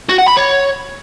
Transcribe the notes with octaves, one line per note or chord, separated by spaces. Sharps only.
F#4
F#5
B5
C#5